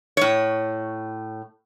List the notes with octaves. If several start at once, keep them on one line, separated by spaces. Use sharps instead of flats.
A2 C#5